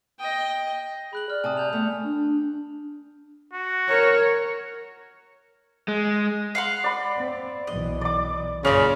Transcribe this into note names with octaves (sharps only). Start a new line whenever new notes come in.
D#5 G5
G#4 B5 F#6 F#7
D5 F6
C3 G#5 A5 D#6
G#5 G6 F7
A3 B3
D4
F#4
A#4 C#5
G#3
F5 F#5 C6
D5 B5
C4
B1 E3 D#5
D5 D6
F#2 A#2 C#3 C#4 F4 A#4 D5